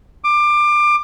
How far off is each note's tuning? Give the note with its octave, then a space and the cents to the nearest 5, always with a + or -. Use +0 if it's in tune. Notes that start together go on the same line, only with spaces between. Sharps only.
D6 +25